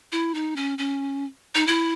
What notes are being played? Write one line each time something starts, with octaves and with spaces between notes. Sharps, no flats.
E4
D#4
C#4
C#4
D#4
E4